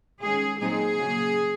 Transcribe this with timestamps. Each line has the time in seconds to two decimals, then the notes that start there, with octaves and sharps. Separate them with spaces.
0.22 D#3 G#3 C#4 G#4
0.60 A#2 F#3 C4 D#4 G#4
0.98 C#3 F#3 A#3